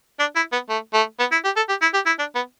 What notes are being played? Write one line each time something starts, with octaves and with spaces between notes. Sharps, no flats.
D4
E4
B3
A3
A3
B3
E4
G4
A4
G4
E4
G4
E4
D4
B3